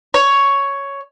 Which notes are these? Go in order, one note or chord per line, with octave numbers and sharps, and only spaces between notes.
C#5